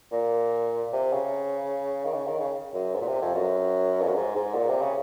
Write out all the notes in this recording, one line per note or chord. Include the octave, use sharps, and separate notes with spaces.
A#2
C3
C#3
D#3
C#3
D#3
C#3
F#2
G#2
A#2
C3
F2
F#2
F2
F#2
G#2
G#2
A#2
C3
C#3